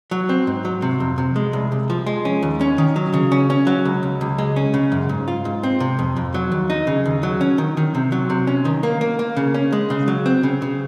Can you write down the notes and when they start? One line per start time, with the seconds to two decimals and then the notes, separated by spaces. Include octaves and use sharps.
0.11 F#3
0.29 C4
0.47 G#2
0.65 F#3
0.82 C3
1.00 F2
1.18 C3
1.36 G#3
1.53 C2
1.72 C2
1.90 F3
2.06 G#3
2.25 C#4
2.43 D#2
2.61 C#4
2.78 D#3
2.96 F#3
3.14 C#3
3.32 C#4
3.50 C#4
3.67 F#3
3.85 C#2
4.03 C#2
4.21 C#2
4.38 G#3
4.56 C#4
4.74 C#3
4.92 F#2
5.09 G#2
5.28 F4
5.45 G#2
5.63 C4
5.80 C3
5.99 F2
6.16 F2
6.34 F#3
6.52 D#2
6.70 D#4
6.87 C#3
7.06 D#2
7.23 F#3
7.41 C#4
7.58 D#3
7.77 D#3
7.95 C3
8.12 F#3
8.30 C3
8.47 C#4
8.65 D#3
8.83 A#3
9.01 A#3
9.19 A#3
9.37 C#3
9.54 C#4
9.72 G#3
9.90 C#3
10.08 F#3
10.26 C4
10.43 C#3
10.62 C#3